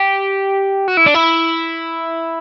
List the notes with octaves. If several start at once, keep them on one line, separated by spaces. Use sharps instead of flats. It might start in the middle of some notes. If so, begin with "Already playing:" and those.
Already playing: G4
F#4
E4
D4
E4